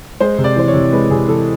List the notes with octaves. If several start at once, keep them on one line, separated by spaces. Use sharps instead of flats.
G#3 C5
C3
D5
E3 C5
C#5
C3
G#3 B4
C3 G#4
E3 A4